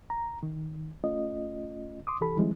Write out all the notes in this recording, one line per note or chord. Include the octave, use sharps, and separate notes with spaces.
A#5
D#3
A3 C#4 F4 D#5
C6 D6 D#6
C2 E3 G4 A4 B5
D#3 F3 G3 G#3 C4 E4